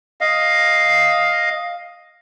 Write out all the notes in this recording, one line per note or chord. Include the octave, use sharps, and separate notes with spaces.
D#5 F5